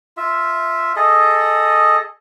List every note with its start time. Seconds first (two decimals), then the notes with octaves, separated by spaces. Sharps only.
0.17 F4 E5
0.96 G#4 A4 D#5